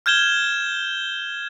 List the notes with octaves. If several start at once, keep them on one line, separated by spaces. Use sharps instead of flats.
F6 G6 G#6 E7 G7